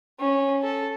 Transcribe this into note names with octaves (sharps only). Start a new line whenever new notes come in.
C#4
A4